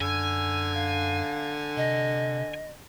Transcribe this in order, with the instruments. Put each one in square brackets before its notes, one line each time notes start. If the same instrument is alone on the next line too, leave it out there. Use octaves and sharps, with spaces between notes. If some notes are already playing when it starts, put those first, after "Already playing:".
[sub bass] F#2 [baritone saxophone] D3 [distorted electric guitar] G#5 [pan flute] E6
[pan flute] F5
[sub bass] C3 [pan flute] D#5